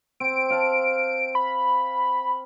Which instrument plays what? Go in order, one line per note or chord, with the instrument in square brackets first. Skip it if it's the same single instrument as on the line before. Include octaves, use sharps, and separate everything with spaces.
[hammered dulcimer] C4 [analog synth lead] D7
[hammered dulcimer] F5 A5
[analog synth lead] B5